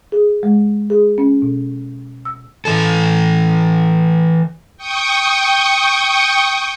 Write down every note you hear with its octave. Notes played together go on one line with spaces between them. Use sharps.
G#4
G#3
G#4
C#4
B2
E6
E3 A4
G5 C#6 D#6